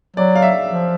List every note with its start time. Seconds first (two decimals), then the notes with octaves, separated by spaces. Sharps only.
0.16 F#3 D5
0.35 F5
0.42 E5
0.68 F3